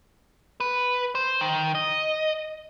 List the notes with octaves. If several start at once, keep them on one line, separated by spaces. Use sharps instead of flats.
B4
C5
D#3
D#5